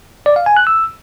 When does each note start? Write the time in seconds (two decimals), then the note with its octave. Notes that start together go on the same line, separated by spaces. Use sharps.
0.26 D5
0.36 F5
0.46 G#5
0.57 F#6
0.67 E6